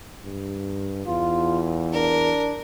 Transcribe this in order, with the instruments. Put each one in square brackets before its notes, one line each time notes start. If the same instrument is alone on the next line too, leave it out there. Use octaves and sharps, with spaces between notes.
[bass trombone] G2
[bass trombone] E2 [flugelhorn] F4
[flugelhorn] D4 [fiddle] A#4